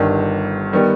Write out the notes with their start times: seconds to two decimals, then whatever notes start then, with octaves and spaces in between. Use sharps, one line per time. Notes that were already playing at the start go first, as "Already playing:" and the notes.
Already playing: G1 G2 D#3
0.73 D#3 G3 B3